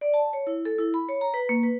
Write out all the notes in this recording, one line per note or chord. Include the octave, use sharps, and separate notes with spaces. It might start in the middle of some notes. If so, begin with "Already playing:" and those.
D5
A5
C#5
E4
A4
E4
B5
C#5
A#5
B4
A#3
B4